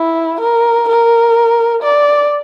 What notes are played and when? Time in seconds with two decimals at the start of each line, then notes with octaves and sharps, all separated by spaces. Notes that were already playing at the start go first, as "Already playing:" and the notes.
Already playing: E4
0.41 A#4
0.89 A#4
1.83 D5